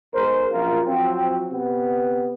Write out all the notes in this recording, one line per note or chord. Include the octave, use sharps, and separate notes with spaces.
B1 G#3 A#4 C5
A#1 F#2 F3 F4 A#4
F3 F#3 C4
C3 B3